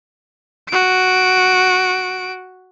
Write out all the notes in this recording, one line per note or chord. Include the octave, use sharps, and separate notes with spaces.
F#4 D7